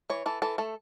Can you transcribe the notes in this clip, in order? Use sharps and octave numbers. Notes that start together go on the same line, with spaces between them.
E3 C#5
E3 A4
E3 A4
A3 A4